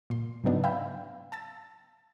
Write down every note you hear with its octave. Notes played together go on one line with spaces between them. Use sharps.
A#2 C6
G#2 C#3 F#3 B3 D4 D#4
E5 F5 G5 A#5 B5 G6
A5 E6 A6